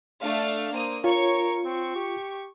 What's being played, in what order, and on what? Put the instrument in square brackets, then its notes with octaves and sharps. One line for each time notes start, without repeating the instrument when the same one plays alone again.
[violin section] A3 D4 F5
[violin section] A#3 D#6 [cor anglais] C5
[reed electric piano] F4 [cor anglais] A#4 [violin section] C#5 C#6
[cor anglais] C4 [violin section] C#6
[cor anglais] G4